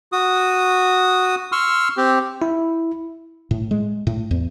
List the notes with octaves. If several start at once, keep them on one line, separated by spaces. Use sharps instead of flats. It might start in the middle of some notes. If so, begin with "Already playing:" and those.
F#4 D#6
C6 C#6 E6 F6
C4 G4
E4
A2
G#3
A2
E2